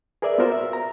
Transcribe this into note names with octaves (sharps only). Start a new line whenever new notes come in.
G#4 A#4 B4 D5 E5
B3 F4 F#4 A#4 C5
E5
A#5